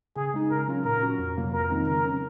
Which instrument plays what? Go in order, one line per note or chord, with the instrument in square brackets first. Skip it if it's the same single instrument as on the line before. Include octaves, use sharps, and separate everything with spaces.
[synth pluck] C#3 [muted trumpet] G#4
[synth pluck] G#3 D#4
[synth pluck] C#3 [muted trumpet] A#4
[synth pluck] F#3 C#4 F4
[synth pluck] A#2 [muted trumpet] A#4
[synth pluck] F#3 C#4 F#4
F2
C3 F#3 A#3 F4
[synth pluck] F2 [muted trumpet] A#4
[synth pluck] D#3 G#3 C4 D#4
[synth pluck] C#3 [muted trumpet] A#4
[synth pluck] F#3 C#4